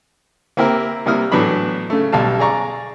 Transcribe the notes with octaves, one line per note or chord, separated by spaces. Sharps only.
A#3 C4 E4 G4 A#4
C3 G3 A#3 E4 D#6 F6
A2 E3 F#3 B3 D4 B5
C#3 A3
B1 G3 F5 A5
G#4 D5 A#5 C#6